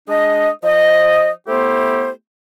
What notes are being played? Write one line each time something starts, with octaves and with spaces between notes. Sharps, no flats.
G#3 D4 D#5
F3 C5 D#5
A3 B3 E4 G4 C5